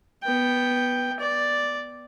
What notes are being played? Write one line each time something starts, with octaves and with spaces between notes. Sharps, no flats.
B3 G5
D5